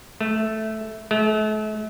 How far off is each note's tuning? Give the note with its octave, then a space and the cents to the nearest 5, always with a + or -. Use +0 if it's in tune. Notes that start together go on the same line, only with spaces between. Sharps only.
A3 -5
A3 -40